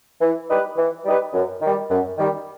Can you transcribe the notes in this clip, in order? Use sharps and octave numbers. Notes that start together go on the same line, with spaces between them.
E3
G3 D#4 G4 B4
E3
G3 D#4 G4 B4
F#2
D#3 G3
F#2
D#3 G3